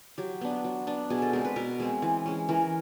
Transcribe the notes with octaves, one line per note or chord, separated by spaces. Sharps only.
F#3 G4
B3 D4
F#3
B3 D4
B2 G#4
A4
G#3 C4 A#4
B4
B2 A#4
G#3 C4
E3
G#3 C#4
E3 A#4